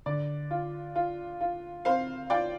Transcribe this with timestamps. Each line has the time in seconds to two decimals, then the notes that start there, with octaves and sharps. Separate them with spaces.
0.06 D3 D5
0.51 F4
0.95 F4
1.41 F4
1.85 C4 C5 F5
2.30 F4 D5 G5